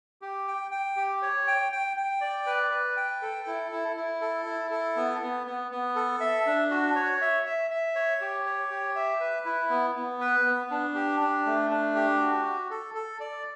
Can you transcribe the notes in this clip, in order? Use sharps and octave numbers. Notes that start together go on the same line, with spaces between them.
G4
G5
G5
G4
C#5
G5
G5
G5
D5
B4
B4
G5
A4
E4
E4
E4
A4
E4
A4
B3
B3
B3
B3
A4
E5
D4
F#4
C#5
E5
E5
E5
C#5
G4
C#5
G4
E5
B4
E4
B3
B3
B4
B3
D4
G4
D4
A3
D4
G4
F#4
F#4
A4
A4
D5